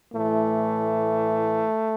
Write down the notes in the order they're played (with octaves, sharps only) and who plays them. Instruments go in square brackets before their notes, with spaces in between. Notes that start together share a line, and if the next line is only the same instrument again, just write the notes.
[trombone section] A2 E3 A3